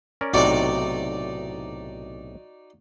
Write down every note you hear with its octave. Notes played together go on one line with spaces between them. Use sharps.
C#4 A#4 D5
B1 A2 C3 D#4 F#4 D5